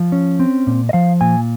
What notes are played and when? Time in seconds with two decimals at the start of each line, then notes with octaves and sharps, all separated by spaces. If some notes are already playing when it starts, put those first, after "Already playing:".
Already playing: F3
0.12 C#4
0.40 C4
0.67 A#2
0.89 D#5
0.93 F3 F5
1.21 A#2 G#5